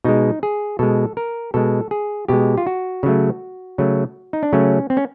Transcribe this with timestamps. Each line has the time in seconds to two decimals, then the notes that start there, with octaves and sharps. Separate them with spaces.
0.04 B2 G#3 D#4
0.43 G#4
0.79 B2 G#3 A4
1.17 A#4
1.54 B2 G#3 A4
1.91 G#4
2.28 B2 G#3 G4
2.58 F4
2.67 F#4
3.03 C#3 F#3 A3
3.78 C#3 F#3 A3
4.33 D#4
4.43 D4
4.53 C#3 F#3 A3 C#4
4.90 C4
4.97 C#4